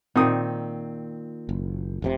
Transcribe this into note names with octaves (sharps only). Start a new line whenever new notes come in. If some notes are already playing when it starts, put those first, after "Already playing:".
A#2 D#3 C4 D#6
F#1
F1 G#2 C3